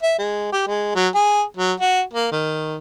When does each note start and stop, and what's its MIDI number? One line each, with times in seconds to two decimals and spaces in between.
0.03 0.14 76
0.19 0.49 56
0.52 0.63 67
0.67 0.93 56
0.95 1.08 54
1.15 1.43 68
1.57 1.73 54
1.80 2.01 66
2.14 2.28 58
2.32 2.78 51